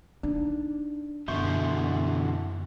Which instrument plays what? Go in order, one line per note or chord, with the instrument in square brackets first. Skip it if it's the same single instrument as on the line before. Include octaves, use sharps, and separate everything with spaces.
[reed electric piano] D4 [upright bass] D#4
[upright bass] F#2 [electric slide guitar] B2 D3 [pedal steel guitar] E3 C6 C#6 [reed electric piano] E5 G6